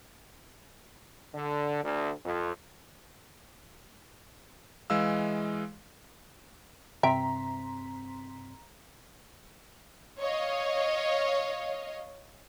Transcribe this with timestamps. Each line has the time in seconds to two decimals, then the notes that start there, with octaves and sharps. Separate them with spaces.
1.34 D3
1.83 D2
2.23 F2
4.90 E3 G#3 D#5 F5 E6
7.03 G2 C3 C4 E5 G5 A#5 C6 B6
10.20 C#5 D#5 F5